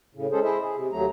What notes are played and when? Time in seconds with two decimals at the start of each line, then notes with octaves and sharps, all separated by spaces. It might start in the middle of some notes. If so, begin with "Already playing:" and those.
0.15 A2 C#3
0.32 G#3 C#4 G#4 A4 C5
0.44 E4 G#4 C5 D#5 E5
0.61 G#4
0.76 C3
0.92 D#2 F#3 A3 A#5